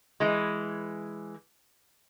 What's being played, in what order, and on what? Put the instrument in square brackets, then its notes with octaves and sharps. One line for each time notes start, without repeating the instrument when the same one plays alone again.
[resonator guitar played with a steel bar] E3 G#3